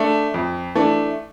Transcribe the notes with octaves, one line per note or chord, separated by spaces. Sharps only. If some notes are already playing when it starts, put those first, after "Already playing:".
Already playing: A3 D4
F2
E3 A3 D4